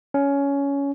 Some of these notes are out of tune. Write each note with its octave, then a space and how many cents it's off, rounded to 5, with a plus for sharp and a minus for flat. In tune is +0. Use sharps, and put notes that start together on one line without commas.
C#4 +15